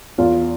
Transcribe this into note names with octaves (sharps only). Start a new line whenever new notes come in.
E2 F4